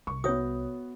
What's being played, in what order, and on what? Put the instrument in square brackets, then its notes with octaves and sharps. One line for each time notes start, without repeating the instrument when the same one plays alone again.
[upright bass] C2 [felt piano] C#6
[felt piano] B3 F#4 [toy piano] C#5 E5 D#6